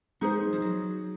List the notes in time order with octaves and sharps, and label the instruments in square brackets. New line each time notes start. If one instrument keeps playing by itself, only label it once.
[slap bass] G#3 [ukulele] D#4 G#4 C5
[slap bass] F3
F#3